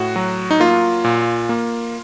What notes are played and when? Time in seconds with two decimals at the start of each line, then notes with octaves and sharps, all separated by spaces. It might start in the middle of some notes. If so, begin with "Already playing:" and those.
Already playing: A2 F#4
0.16 F#3
0.51 D#4
0.60 A#3 F4
1.04 A#2
1.49 A#3